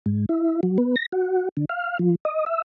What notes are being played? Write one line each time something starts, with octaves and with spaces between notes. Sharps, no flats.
G#2
E4
F#3
B3
A#6
F#4
D3
F5
F3
D#5
E5